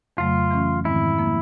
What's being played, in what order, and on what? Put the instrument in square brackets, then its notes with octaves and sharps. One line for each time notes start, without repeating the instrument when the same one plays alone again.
[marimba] F2 C#3 F#3 A3 [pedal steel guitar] F4
[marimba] E3 A3 C#4
[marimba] G#2 D#3 G#3 C4 [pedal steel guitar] E4
[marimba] F3 A#3